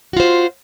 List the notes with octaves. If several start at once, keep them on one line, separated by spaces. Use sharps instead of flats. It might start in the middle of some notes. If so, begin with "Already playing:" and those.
F4 F#4 C5